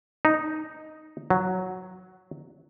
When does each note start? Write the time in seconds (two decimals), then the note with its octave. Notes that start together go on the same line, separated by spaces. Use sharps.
0.25 D#4
1.30 F#3